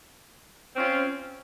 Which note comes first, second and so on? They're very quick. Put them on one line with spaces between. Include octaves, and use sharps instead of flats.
C4 C#4 F4